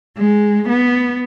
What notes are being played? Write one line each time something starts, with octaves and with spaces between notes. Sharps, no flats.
G#3
B3